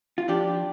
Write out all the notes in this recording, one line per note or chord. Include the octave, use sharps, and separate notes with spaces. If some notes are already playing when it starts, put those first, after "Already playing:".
F4
F3 D4 G4